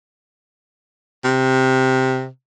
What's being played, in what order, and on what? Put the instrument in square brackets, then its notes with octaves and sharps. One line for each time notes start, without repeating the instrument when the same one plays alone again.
[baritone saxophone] C3